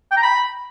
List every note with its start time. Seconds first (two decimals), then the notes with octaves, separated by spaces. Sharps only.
0.11 G5
0.17 A#5
0.23 B5